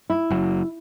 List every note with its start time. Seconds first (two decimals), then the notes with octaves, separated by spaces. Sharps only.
0.10 E4
0.31 F#1 F#3